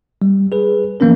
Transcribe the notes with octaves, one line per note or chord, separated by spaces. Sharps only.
G3
G#4 B4
E3 F3 A#3 B3 C#4 A#4